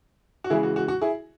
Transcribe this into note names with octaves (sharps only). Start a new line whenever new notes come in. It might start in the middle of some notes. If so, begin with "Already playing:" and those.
F#4
C#3 E3 G#3 E4 G#4
F#4
F#4
F#4
E4 G#4